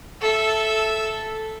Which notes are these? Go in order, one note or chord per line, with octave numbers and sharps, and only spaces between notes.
A4 E5